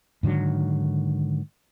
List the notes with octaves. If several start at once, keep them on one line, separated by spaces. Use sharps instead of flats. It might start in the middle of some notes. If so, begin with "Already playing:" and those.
G#2 D3 D#3 F#3